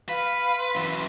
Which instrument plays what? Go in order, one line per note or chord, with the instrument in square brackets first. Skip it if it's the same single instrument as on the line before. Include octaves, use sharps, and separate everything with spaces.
[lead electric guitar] B4 [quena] F5
[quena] C6
[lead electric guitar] F#2 E3